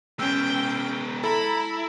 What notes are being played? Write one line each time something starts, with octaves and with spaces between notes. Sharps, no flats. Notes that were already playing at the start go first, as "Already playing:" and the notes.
G#3 B3 C#4 G5 E6
E4 A4 A#5 B5